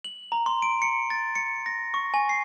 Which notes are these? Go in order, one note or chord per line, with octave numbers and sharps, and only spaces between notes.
F#7
A#5
C6
D7
C#7
A6
C#7
A#6
C#6
G#5
C7